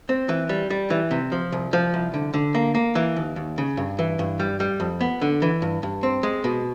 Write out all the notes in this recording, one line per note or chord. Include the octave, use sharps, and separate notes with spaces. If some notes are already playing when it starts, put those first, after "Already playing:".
C4
E3
G3
G3
E3
C3
F3
C2
F3
C2
D3
D3
A#3
A#3
E3
D#2
D#2
C#3
G2
E3
G2
G3
G3
F2
B3
D3
E3
G2
G2
C4
G#3
B2